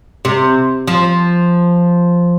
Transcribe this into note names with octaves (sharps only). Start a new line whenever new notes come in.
C3
F3